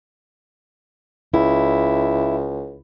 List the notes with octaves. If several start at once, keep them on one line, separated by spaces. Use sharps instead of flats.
C#2 E4